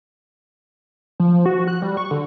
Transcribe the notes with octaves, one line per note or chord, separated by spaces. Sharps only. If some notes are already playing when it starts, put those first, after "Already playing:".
F3
F#4
F#6
G3
C#6
D3